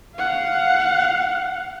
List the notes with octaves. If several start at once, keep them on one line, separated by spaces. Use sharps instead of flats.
F5 F#5